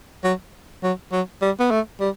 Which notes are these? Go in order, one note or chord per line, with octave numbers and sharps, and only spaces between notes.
F#3
F#3
F#3
G3
B3
A3
G3